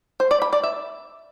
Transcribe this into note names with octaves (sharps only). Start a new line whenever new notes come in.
C5
D5
B5
D5
E5